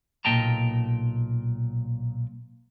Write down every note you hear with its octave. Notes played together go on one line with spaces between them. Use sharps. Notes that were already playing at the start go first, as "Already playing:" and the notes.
B1 A#2 D#5 G5 A5 A#5